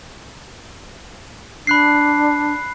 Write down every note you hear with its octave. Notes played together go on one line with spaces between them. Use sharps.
D4 B5 F#6 C7